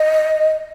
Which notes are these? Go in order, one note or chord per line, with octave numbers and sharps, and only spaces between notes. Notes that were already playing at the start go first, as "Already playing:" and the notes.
Already playing: D#5